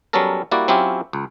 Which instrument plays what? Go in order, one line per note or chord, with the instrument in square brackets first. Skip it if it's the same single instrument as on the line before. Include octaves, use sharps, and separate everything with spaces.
[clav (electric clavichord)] F#3 G3 B3 C#4 A4 A#4
G3 A#3 E4 F#4 D5
F#3 C4 C#4 E4 F4 G4
C#2